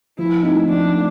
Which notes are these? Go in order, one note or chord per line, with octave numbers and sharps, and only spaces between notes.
F3 E4
A3 C4 D#4
F3 D4
A3